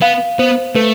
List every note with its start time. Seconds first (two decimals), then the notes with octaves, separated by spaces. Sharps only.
0.01 B3 F5
0.39 B3 C5
0.75 A3 B4